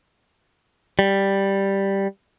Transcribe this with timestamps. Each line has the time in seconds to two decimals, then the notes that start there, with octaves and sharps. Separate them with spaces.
0.99 G3